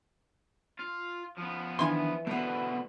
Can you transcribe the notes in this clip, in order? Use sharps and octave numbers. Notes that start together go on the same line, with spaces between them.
F4
F3 B3
D#3 E3 D4 G#5 C6
B2 D3 A3 B3